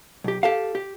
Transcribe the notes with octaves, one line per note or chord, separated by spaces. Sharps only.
B1 G4
G4 A4 F5
G4